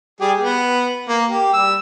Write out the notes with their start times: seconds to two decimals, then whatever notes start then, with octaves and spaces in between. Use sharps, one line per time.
0.21 G3 G4 G#4
0.38 B3
1.08 A#3
1.29 G4
1.53 G3 E6